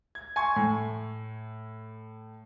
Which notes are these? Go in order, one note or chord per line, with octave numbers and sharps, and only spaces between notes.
G#6
G#5 C6 C#6 G#6
A2